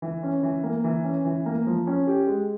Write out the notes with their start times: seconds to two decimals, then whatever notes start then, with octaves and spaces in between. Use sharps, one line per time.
0.02 E3
0.23 C#4
0.43 E3
0.64 A#3
0.84 E3
1.04 C#4
1.25 E3
1.46 A#3
1.67 F3
1.87 C#4
2.07 G4
2.27 G#3